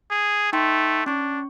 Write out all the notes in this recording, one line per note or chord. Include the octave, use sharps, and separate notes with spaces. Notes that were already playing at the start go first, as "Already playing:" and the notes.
G#4
A3 D#4 G5 C6
C#4 D4 C#6